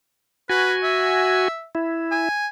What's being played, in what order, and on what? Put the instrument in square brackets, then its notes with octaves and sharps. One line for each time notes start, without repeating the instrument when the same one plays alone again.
[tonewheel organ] F#4 G#5 [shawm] B4
[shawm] E5
[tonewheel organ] E4
[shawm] G#5